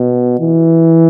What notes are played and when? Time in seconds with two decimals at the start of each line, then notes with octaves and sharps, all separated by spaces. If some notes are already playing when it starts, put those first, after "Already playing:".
Already playing: B2
0.40 E3